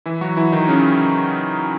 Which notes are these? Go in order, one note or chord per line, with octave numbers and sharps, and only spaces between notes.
E3 E4
F#3 F#4
E3 E4
D#3 D#4
C#3 C#4